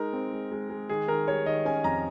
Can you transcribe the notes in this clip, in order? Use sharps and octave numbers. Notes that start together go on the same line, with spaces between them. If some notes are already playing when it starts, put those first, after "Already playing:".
Already playing: G#3 D#4 A#4
C4
G#3
G#3
G#3
D#3 G#4
D#3 A#4
G3 C#5
D#3 D#5
C#4 G#5
F2 A#5